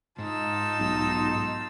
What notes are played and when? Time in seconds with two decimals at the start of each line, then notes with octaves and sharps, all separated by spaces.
0.19 G#2 D#4 F4 A5 E6
0.79 B1